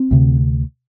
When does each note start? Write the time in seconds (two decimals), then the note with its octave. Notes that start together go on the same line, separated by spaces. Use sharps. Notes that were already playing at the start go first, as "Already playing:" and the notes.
Already playing: C4
0.11 D2 C3